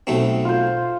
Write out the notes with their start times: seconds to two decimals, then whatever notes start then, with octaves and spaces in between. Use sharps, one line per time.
0.07 B1 A3 C4
0.45 F4 C5